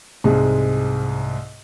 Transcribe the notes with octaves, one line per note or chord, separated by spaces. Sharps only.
C2 G#2 G#3